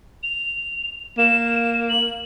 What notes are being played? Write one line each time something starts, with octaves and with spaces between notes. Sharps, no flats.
F7
A#3 E7
F#7